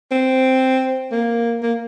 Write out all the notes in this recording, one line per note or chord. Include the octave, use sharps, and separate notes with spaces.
C4
A#3
A#3